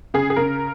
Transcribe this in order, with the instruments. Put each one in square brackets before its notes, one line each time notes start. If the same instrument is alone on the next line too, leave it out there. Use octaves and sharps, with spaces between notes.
[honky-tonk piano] C#3 G#4
G#4
C#3 A#4